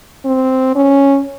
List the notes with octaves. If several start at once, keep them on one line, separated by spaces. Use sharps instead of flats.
C4
C#4